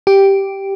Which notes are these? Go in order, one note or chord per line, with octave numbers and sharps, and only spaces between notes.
G4